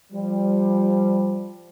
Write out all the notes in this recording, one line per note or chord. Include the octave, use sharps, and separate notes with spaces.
F3 G3